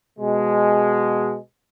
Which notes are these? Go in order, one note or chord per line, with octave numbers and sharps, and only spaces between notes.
B2 G#3